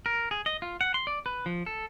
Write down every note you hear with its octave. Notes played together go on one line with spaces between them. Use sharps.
A#4
G#4
D#5
F4
F#5
C6
D5
B4
F3
A4